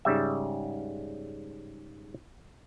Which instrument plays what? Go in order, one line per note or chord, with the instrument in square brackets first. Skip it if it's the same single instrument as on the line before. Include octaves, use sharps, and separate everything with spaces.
[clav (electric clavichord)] G#2 C#3 G3 E5